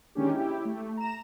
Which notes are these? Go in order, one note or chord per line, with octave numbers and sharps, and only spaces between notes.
D#3 G#3 A#3 C#4 D4 G4
E4 G4
A3
A#5 E7